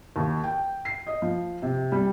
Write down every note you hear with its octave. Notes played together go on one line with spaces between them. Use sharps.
D#2
G5
C7
D#5
F3
C3
G3